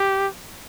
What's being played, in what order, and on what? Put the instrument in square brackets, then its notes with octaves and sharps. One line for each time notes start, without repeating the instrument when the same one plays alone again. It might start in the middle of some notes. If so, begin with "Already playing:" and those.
Already playing: [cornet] G4